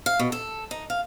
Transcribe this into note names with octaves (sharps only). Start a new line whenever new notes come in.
F5
B2
A4
D#4
F5